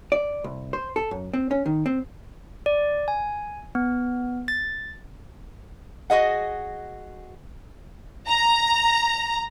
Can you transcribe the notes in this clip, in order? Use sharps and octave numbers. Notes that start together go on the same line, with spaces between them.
D5
C2
C5
A4
F#2
C4
C#4
D#3
C4
D5
G#5
B3
A6
F#4 G#4 D#5 F#5
A#5